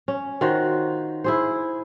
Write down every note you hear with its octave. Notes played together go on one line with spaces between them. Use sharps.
C#4
D#3 F4 F#4 C5
E4 G#4 C5